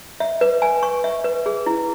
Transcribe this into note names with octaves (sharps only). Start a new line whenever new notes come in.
E5
B4
G#5
C#6
E5
B4
G#4
E4